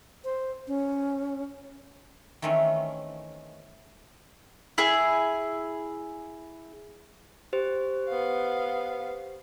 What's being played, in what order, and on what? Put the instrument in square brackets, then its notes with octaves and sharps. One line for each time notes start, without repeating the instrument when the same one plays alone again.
[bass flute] C5
C#4
[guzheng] D#3 E3 A3 C4 C#4
[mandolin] E4 G#4
[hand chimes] G4 C5
[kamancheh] B3 F5